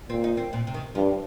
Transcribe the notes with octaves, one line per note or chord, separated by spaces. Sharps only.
A#2 C4
D#4
C4
A#2
C3
D#3
G2 F3